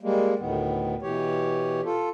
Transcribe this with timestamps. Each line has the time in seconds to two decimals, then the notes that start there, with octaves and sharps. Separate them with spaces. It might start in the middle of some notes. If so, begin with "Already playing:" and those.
0.01 G3 G#3 A#3
0.39 D2 A2 D#3 B3
1.02 B2 E3 G4 C#5
1.85 F4 A4